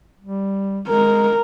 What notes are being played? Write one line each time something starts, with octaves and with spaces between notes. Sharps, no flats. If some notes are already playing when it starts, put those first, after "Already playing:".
G3
G#3 A#4